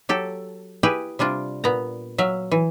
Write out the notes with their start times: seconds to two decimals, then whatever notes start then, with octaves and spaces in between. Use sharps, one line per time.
0.09 F#3 G4 A4
0.83 E4 G4 G#4 B4
1.19 C3 G3 D4 F4
1.64 A#2 B3 A#5
2.18 F#3 E5 F5
2.51 E3